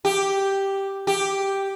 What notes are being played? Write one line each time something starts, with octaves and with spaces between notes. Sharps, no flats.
G4
G4